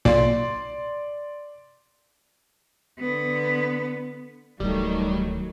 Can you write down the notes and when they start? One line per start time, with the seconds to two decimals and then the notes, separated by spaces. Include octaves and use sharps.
0.05 B1 A#2 D5 C6
2.99 D3 B3
4.60 D1 D#3 E3 F#3 G3 A3